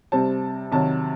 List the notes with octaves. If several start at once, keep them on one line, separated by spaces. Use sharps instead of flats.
C3 G3 C4 A5
C3 D#3 F#3 A5